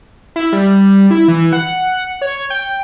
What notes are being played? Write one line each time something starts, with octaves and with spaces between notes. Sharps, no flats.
E4
G3
E4
E3
F#5
C#5
G5